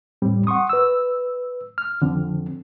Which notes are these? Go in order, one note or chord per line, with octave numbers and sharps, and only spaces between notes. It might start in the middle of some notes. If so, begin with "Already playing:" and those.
E2 A2 G3 C4
F#5 C6 C#6 D#6
B4 E6
F6
F2 D3 F3 C4